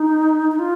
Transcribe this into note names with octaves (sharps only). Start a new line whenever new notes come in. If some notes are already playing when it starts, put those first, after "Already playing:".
Already playing: D#4
D#4
F4